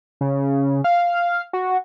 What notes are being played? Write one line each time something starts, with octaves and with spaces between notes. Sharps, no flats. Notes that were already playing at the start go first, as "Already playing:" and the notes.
C#3
F5
F#4